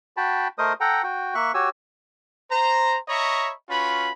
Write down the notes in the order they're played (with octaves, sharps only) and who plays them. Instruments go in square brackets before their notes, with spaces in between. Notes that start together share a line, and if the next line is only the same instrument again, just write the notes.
[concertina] F#4 G5 A5 B5
A3 A#4 C5 D#5 D#6
A4 F#5 G5 A#5
F#4 G5
A#3 E5 C#6 F#6
F#4 G4 C#5 G#5 E6
[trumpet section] C5 A#5
C#5 D#5 E5 A#5 B5 C#6
C#4 F4 F#4 B4 B5